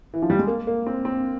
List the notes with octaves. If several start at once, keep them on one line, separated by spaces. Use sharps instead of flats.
E3
F3
G3
G#3
A#3
A#3
C4
C4